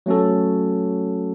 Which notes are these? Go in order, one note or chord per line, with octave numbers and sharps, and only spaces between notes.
F#3 A3 C#4 F#4 A4